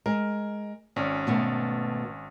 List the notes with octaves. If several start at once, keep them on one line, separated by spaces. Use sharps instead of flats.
G#3 A#4
G#1 C#4 D5
B2 A3 B3